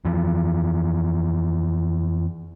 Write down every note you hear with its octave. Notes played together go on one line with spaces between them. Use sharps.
F2 E3 F3